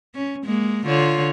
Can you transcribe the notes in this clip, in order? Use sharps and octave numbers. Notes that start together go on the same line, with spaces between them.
C#4
G#3 A#3
D3 F4 C#5